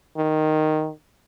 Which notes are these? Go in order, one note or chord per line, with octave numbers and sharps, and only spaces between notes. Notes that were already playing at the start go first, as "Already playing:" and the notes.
D#3